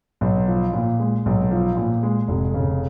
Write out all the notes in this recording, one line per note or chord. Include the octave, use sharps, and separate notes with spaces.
B1
F3
A#2
G#3
B1
F3
A#2
G#3
F1
C#3